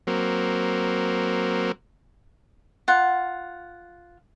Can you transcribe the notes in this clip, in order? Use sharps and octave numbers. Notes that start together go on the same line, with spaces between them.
F#3 A#3 C4
F4 F#5